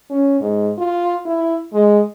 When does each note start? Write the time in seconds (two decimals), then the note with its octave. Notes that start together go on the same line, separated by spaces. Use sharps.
0.10 C#4
0.41 G#2
0.78 F4
1.26 E4
1.73 G#3